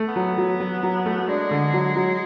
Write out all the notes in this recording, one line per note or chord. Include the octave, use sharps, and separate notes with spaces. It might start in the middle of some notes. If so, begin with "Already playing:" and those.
Already playing: A3
B3
F#3
F#3
F#3
F#3
A3
G#3 D4
D3
F#3
F#3